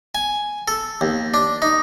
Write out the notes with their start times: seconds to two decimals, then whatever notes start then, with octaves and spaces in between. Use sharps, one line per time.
0.15 G#5
0.68 A4
1.01 D#2
1.34 D4
1.62 D#4